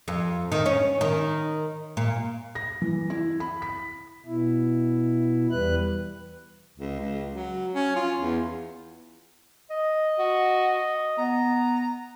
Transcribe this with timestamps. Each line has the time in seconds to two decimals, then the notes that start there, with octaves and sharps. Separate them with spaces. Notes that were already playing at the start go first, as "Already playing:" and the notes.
0.08 F2
0.52 D#3
0.66 C#4
1.01 D#3
1.97 A#2
2.55 A#6
2.82 E3
3.10 E4
3.40 B5
3.62 B6
4.26 B2 E4
5.51 E2 G3 B4 F#6
6.77 C#2
7.00 C#2
7.34 F#3
7.74 C#4
7.96 F4
8.19 E2
9.70 D#5
10.19 F#4
11.18 B3 A#5